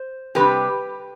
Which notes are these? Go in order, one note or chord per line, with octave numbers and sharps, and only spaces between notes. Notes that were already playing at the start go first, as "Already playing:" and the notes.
Already playing: C5
C3 G3 D4 G4 B4